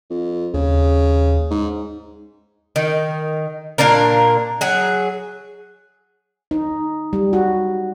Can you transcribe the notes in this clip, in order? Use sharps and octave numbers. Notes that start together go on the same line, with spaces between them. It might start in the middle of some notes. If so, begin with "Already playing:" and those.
F2
D#2 C#3
G#2
D#3
A#2 A#3 D4 A#4
F#3 G#4
D#4
G3
F#4